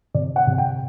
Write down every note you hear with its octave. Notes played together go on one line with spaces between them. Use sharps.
C3 D5
F#5
C3
G5